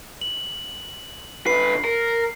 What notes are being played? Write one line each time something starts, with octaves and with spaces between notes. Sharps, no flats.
F#7
D3 B4 C7
A#4